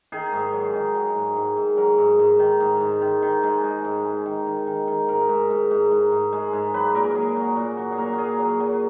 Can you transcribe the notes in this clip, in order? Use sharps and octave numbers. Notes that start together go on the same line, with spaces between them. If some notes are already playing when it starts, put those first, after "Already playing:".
D#3 G#4
G#2
F#3
D#3
F#3
G#2
G#2
G#2
F#3 A#4
G#2
G#2
D#3
G#2
G#2
D#3
D#3
G#3
G#3
G#2
G#3
D#3
D#3
D#3
D#3
G#2 A#4
G#2
G#2
G#2
G#2
G#2
G#3
G#2
F#3 B4
A#2 A#4
F#3 G#4
F#3 F#4
A#2
F#3 F#4
G#4
A#2 A#4
F#4
F#3 G#4
F#3
F#3